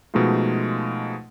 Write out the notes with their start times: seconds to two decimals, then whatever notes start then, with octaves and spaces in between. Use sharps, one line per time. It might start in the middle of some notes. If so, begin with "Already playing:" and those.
0.14 B2 F3 G#3 A3 D#4 F4